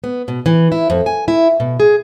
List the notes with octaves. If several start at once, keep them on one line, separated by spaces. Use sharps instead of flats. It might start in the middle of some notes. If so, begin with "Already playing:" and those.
B3
B2
E3
E4
F2
G#5
E4
B2
G#4